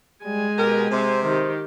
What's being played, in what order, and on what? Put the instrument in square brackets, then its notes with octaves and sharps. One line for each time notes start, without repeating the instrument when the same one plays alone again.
[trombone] G3 [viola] G#3 G#5
[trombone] B2 [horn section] G4 A#4
[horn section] C3 [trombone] C5
[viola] D#3 G4 [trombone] C5